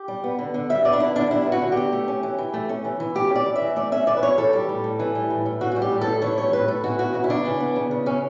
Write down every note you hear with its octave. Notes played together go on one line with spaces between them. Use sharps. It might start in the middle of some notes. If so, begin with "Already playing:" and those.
Already playing: G4
G3
B3
D3
D3
G3 E5
B3 D5
D4
D3 E4
D3 D4
G3 E4
B3
F#4
D3
G4
D3
A3
C#4
E3
E3
A3
C#4
E3
E3
A3 G4
C#4
D5
E3
E5
E3
A3 D5
C#4 E5
E3 D5
B4
E3 C#5
E3 A4
G3
A2
A2
E3
G3
A2
A2
E3 F#4
G3 F#4
G4
A2
A4
A2
E3 C#5
G3 C#5
A2 B4
A2 A4
E3 F#4
B3 F#4
C#3 F#4
E4
C#3 D4
E3
B3
C#3
C#3
E3 C#4